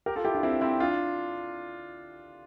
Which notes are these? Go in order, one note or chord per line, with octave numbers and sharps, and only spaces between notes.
G4 A#4
F4 A4
E4 G4
D4 F4
C4 E4
C4 E4
D4 F4